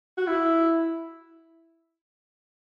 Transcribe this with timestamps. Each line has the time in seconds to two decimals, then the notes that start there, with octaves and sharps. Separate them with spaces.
0.17 F#4
0.27 E4